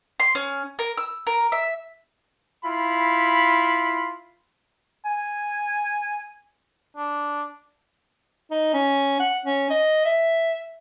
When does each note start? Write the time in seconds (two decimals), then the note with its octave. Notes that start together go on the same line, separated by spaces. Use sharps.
0.20 C6
0.35 C#4
0.79 A#4
0.98 E6
1.27 A#4
1.52 E5
2.65 E4 F4 B5
5.05 G#5
6.96 D4
8.51 D#4
8.74 C#4
9.20 F#5
9.46 C#4
9.71 D#5
10.05 E5